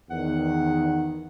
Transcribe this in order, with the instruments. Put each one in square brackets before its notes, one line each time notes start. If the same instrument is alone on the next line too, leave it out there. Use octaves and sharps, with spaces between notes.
[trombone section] E2 D#3 [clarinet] F#5